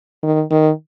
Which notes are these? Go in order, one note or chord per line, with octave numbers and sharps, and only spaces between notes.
D#3
D#3